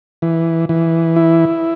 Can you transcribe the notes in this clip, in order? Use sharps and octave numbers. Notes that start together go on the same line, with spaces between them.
E3
E3
E4